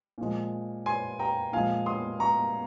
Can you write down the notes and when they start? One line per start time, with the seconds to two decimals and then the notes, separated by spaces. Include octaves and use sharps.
0.18 A#2 F3 G#3
0.86 G#5 C6
1.19 G5 A#5
1.53 A#2 F3 G#3 F5 G#5
1.86 C6 D#6
2.20 A#5 C#6